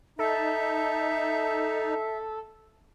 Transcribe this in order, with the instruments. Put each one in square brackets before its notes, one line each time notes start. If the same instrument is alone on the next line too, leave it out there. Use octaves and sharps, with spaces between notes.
[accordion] D#4 [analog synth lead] A4 [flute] E5